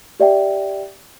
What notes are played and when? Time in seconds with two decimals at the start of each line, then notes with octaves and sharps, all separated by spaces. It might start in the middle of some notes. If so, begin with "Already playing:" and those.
0.20 G4 D5 E5 G5